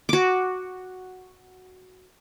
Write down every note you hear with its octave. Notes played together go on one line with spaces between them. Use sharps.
F#4 D6